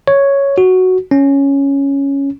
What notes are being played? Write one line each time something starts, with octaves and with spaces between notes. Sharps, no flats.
C#5
F#4
C#4